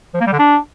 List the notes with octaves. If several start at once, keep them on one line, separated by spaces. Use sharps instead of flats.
F3
A#3
G3
D3
D4